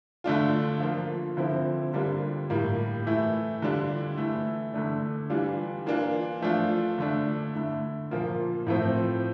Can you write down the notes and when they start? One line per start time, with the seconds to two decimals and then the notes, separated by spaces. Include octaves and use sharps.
0.24 D3 A3 D4 F4
0.80 F3 A#3 F4
1.37 D3 F3 C4 E4
1.93 D3 G3 A#3 D4 F4
2.50 A2 G3 A#3
3.05 E3 A3 E4
3.62 D3 G3 D4 F4
4.17 E3 A3 E4
4.74 D3 A3 D4
5.30 E3 G3 D4 F4
5.86 E3 A#3 D4 F4
6.42 F3 A3 D4 F4
6.98 D3 A3 D4
7.55 D3 A3 E4
8.11 A#2 F3 A#3 F4
8.67 A2 F3 A3 C4